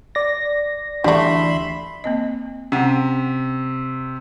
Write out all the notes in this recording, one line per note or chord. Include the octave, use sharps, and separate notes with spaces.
D5 A#6
D2 E3 G3 A3 D4 E5 B5 C6
A#3 C4 D#5
C3 C#4 F#5